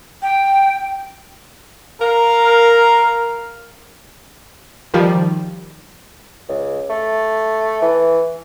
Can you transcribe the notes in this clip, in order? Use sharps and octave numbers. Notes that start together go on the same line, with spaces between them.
G5
A#4 F5
D#3 F3 G3
C#2
A3
E3